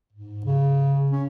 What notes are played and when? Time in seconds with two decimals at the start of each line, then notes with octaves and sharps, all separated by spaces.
0.13 G#2
0.45 C#3
1.12 C#4